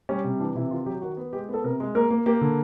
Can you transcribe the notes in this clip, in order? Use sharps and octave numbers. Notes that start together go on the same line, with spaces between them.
G3 C#4
C3
E3 D4
C3 E4
D#3 F4
F#3 G4
D#3 F#4
B3
G#3 G4
B3 A4
C3 A#4
G#3
A#3 A#4
A#3
A#3 G4
D3